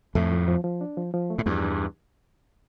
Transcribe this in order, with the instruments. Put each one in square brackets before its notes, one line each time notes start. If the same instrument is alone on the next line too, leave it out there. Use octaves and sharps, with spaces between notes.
[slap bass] F2 A2 [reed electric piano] A3
[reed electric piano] F3
F3
F3
D4
F3
F3
A3
[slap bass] A2
[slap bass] E2 G2 [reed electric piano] F3
[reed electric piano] D4